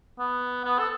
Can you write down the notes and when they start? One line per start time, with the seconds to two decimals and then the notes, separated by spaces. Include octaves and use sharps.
0.19 B3
0.65 B3
0.79 A4